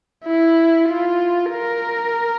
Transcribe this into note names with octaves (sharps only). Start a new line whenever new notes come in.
E4
F4
A#4